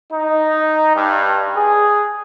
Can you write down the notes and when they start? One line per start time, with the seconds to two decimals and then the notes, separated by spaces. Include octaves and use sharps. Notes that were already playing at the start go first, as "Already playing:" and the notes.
0.13 D#4
0.95 G2
1.56 G#4